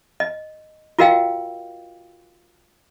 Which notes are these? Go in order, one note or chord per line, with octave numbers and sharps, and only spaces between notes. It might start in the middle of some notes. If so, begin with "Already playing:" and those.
D#5
F4 F#4 A#4 D#5 F5 G5